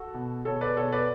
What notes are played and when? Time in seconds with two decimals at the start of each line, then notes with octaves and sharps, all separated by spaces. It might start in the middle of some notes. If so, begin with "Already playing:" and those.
Already playing: F#4 A4
0.14 B2
0.45 B2 A4 C#5
0.61 B4 D5
0.77 B2 A4 C#5
0.92 B4 D5